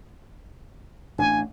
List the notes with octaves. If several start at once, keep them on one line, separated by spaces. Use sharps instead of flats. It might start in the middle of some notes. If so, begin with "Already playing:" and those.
A1 D4 G#5